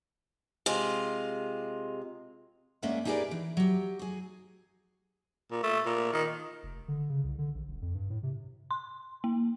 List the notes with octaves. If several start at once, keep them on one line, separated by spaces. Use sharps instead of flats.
C3 G#3 F4
G#3 A#3 C#4 D4 E5 F#5
D#4 G4 G#4 A#4 B4 D5
E3
F#3 G4
F#4 G#4
A#2
A3
A#2
D#3
F1
D3
C#3
C2
D3
A#1
D#1
F2
G2
A2
C3
C6
A#3